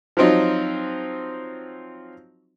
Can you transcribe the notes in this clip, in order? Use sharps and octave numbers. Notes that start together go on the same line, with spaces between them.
F3 F#3 C4 D#4 F4